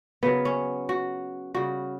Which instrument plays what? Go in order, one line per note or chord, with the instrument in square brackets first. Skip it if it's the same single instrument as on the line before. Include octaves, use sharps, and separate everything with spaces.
[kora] C#3 F#3 B3
C#4
F#4
C#3 G3 F#4